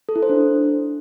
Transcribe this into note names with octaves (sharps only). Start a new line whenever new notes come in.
A4
E4
C5
D4